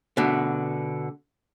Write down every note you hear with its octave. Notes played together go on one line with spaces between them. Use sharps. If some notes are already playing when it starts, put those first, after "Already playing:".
B2 D3